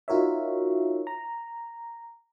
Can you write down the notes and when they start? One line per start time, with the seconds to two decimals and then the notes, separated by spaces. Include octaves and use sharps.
0.08 D#4 F4 F#4 A#4 C#5 E5
1.07 A#5